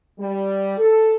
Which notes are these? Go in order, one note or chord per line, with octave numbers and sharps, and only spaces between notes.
G3
A4